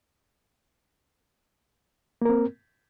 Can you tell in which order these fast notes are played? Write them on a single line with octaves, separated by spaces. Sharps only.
A#3 A#4 C4